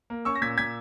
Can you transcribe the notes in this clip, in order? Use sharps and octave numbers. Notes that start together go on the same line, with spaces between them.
A#3
C#4 C#6 E6
A#6
A#2 G#6 B6
A#2 G#6 B6